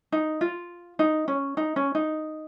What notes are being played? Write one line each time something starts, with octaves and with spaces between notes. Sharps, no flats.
D#4
F4
D#4
C#4
D#4
C#4
D#4